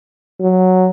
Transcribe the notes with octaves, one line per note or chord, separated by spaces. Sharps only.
F#3